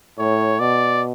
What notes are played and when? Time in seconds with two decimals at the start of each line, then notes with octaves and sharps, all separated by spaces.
0.19 A2 C#5
0.60 B2 D5